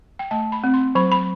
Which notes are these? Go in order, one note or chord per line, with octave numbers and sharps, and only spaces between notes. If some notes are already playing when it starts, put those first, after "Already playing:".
G5
A3 A5
B5
C4
C6
F#3 B5
B5